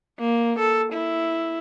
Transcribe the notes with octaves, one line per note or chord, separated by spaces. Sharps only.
A#3
A4
E4